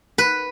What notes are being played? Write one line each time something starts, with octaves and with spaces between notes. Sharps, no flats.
B4